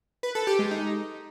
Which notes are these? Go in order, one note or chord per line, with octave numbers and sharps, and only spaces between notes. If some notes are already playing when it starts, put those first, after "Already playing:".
B4
A4
G4
G#3
D#4